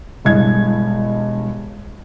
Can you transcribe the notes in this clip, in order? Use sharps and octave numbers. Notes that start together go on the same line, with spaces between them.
E1 E2 G2 D#5 G#6